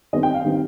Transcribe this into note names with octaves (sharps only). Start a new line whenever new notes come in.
D#3 G3 C4 D#5
G5
F5
D#3 G3 C4